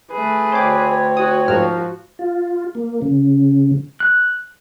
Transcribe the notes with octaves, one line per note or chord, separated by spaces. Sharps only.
A3 G#4 B4
D2 C4 C5 C#5 D6
F#4 D#6
G#2 F3 F#4 A#4 F6
F4
A#3
C#3
F#6